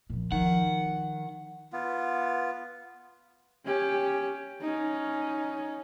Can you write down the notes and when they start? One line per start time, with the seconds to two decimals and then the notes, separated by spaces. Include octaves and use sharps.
0.10 A#2 F3
0.32 D#3 F3 F#5
1.73 B3 F4
3.66 C#4 G4
4.61 C#4 D#4